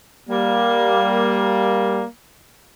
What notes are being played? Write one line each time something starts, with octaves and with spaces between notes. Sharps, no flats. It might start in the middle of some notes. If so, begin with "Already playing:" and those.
G3 A#3